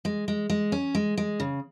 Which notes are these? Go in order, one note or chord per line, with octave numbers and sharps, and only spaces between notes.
G#3
G#3
G#3
C#4
G#3
G#3
C#3